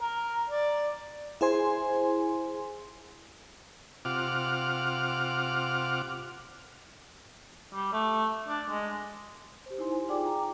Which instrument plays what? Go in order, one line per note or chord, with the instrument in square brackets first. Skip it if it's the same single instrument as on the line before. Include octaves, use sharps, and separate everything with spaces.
[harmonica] A#4
D5
[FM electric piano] E4 G#4 C5 G#5 C6
[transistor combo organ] C3 F4 F#5 D6 F6
[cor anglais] G3
A3
D4
G#3
[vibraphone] G4 C5
D#4 E4 C5 G#5 C6
G#5
D#4 F4 G#4 D5 G5 D6
A#5
D6